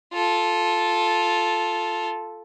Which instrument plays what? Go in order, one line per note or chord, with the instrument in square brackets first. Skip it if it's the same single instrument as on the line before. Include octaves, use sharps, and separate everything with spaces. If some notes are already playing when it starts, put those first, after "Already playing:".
[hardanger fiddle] F4 A4